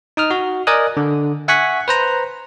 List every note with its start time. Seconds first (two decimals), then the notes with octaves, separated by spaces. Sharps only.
0.17 D#4 D#6 F6
0.31 F#4
0.67 A#4 D5 D#5 G#5 D#6 F#6
0.97 D3
1.48 E5 F#5 G#5 C#6 F#6 B6
1.88 B4 C5 A#5